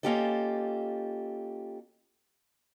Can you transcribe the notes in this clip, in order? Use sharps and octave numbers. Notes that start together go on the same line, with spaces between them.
A#3 C#4 F4 G4 A4 D#5